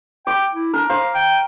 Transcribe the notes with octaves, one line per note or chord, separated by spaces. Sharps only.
G5 D6
E4
D4 A#4
C5 F5
G5